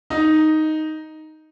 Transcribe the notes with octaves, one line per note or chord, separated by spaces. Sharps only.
D#4